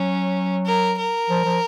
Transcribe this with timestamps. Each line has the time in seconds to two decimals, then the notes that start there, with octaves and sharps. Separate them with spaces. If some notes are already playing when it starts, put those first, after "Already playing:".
Already playing: F#3 C#4
0.66 A#4
0.98 A#4
1.30 F3
1.45 F3